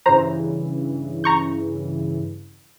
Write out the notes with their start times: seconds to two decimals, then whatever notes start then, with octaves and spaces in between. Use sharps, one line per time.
0.06 G2 C#3 E3 C5 A#5
1.24 A#5 C#6 G6